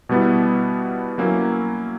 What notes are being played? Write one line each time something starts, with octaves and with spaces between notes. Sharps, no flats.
B2 G3 B3 E4
F#3 A#3 C#4 E4